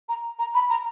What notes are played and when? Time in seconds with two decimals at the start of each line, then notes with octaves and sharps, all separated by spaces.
0.09 A#5
0.39 A#5
0.55 B5
0.70 A#5